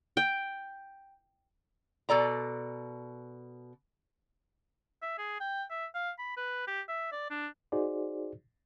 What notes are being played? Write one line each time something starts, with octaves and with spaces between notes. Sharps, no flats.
G5
B2 A4 D5 A#5
E5
G#4
G5
E5
F5
B5
B4
G4
E5
D5
D4
D#4 F#4 G#4 C5 D5